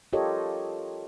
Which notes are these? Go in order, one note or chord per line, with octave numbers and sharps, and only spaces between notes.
F4 G4 A4 A#4 C#5 D#5